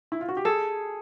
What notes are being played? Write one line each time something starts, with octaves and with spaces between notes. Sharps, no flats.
E4
F4
F#4
G4
G#4 A4